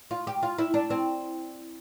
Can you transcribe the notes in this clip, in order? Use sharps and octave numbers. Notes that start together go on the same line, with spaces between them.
F4
G4
F4
E4
D4
C4